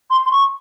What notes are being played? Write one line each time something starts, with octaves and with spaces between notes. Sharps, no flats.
C6
C6
C#6